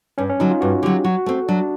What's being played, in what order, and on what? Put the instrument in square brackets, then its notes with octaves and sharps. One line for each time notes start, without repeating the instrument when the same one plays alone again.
[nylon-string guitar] G2 [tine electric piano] C#4
[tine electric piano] C#4
[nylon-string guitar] D3 F#3 [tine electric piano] D#4
[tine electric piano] F4
[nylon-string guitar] G2 [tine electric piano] F#4
[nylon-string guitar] D3 F#3 [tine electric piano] G4
[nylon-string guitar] F#3 [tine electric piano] F#4
[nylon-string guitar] A3 C4
[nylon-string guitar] F#3 [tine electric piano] D4